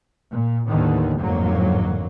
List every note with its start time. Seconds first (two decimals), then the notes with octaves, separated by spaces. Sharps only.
0.31 A#2
0.67 D#2 A2 D3 D#3 B3
1.19 A1 F2 G#2 D3 F#3 A#3